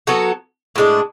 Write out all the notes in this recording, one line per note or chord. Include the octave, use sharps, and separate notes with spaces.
F#3 B3 F#4 A4
A2 G#3 D4